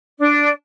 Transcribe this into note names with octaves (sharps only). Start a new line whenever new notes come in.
D4